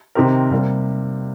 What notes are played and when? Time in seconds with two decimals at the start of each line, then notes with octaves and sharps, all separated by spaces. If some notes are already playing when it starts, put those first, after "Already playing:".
0.15 C3 D#3 C4 G4 A#4
0.51 C3 G3 A#3